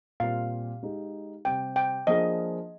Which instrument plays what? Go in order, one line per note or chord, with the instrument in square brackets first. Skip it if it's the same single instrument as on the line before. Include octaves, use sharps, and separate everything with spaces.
[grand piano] A#2 G3 C4 G4 [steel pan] F5
[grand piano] G#3 D#4 G4
[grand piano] C3 G3 C4 [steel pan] G5
[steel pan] G5
[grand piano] F3 A#3 D4 G#4 [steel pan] D#5